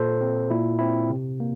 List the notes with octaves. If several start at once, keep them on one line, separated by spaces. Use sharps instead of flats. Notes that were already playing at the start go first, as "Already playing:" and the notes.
Already playing: A#2 A4 C5
C4
A#2 E4
C4 E4
C3
A#3